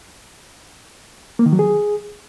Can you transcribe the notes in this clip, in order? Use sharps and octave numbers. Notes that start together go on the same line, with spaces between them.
A#3
D#3
F#3
G#4